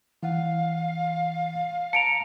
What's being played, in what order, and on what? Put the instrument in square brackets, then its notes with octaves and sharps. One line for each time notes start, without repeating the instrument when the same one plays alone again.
[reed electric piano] E3 F#5 [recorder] F5
[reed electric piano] A5 A#5 [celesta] C#7 D7 F7